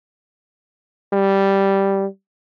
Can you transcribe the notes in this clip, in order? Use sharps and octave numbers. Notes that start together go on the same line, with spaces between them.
G3